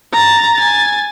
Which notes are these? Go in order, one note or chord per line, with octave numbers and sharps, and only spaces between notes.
A#5 A6
G#5 A6